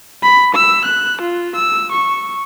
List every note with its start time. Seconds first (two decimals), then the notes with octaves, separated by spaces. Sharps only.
0.23 B5
0.55 E6
0.85 F#6
1.21 F4
1.56 E6
1.92 C#6